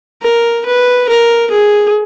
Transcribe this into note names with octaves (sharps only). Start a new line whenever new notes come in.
A#4
B4
A#4
G#4